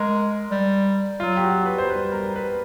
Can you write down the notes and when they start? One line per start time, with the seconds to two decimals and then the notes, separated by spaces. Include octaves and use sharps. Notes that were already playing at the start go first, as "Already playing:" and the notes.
Already playing: G#3 A#4
0.51 G3
1.20 F#3 F4
1.37 G4
1.44 F#4
1.66 B4
1.78 C5
1.89 G3 B4
2.12 A#4
2.36 B4